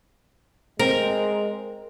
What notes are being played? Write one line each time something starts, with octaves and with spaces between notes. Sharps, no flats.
G#3 C4 A#4